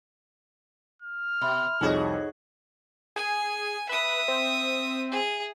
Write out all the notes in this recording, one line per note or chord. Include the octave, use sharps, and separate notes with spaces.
F6
B2 E5 B5 C6
C2 F2 D#4 F#4 G#4 C#5 D#5
G#4 G#5
B4 E5 D#6
C4
G#4